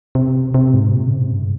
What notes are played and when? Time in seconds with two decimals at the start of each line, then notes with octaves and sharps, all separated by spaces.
0.15 C3
0.54 C3
0.74 G#2
0.93 A#2
1.06 C#3
1.19 C3
1.31 G2